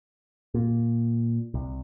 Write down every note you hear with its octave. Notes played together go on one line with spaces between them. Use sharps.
A#2
C2